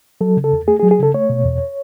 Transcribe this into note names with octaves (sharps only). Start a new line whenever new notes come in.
F#3 A4
C#3
A4
E2
A3 G#4
G#4
F#3
G#4
C#3 A4
A3 C#5
B2
E2